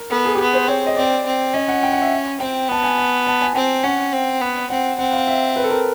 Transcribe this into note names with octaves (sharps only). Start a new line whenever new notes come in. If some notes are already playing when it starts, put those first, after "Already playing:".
Already playing: A#4
B3 A4
G#4
G4
B3 G#4
C5
C4 C#5
D#5
C4 D5
C4
C#4 D#5
F#5
G5
F#5
E5
C4 G5
B3 A5
G#5
A5
A5
G#5
C4 G5
C#4 F#5
C4
B3
C4 F#5
C4 F#5
F5
E5
B4
A4
A#4